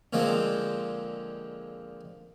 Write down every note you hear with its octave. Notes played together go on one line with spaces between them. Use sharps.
A#2 D3 F3 G#3 C4